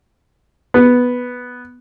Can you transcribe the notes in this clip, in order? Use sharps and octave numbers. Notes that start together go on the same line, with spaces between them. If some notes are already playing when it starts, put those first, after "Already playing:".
B3